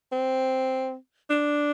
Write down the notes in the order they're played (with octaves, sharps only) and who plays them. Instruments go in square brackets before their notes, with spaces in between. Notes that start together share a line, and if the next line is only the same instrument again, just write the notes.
[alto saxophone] C4
D4